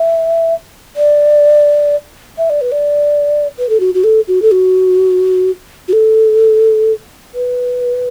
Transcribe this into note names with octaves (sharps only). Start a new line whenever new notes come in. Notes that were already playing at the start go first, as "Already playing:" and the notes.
Already playing: E5
D5
E5
D5
B4
D5
B4
A4
F#4
F#4
A4
F#4
A4
F#4
F#4
A4
B4